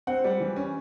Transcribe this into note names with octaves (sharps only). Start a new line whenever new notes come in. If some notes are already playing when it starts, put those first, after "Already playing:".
C4 F#5
G3
E3
C#4